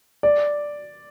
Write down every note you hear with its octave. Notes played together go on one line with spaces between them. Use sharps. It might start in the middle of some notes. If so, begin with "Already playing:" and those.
D5